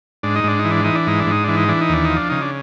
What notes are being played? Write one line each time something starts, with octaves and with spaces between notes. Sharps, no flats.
G#2 D4
D#4
G#2 D4
D#4
E3
D4
E3 D#4
D4
G#2 D#4
D4
G#2 D#4
E3 D4
D#4
E3 D4
D#4
D#2 D4
F3 D#4
D4
C#3 D#4
D4